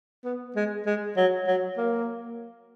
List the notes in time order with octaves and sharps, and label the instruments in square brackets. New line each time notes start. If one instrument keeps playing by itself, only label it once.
[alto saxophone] B3
G#3
G#3
F#3
F#3
A#3